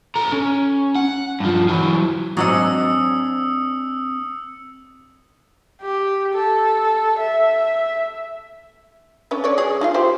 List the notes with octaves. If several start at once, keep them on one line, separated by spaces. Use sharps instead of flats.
A4 A#5
C#4
F#5
G2 F3
E3 F#3
G#2 F#3 C4 D4 D#5 D#6 E6 C#7
G4
A4
E5
C#4 D4 B4
B4 C#5 D5
F#3 G#4
D#4 F4 F5
F4 G4 C5